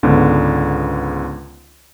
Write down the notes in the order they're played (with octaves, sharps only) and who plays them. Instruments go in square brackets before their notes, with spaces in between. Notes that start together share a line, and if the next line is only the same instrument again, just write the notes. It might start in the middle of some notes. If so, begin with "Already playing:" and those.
[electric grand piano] C#2 G#2 D3 B3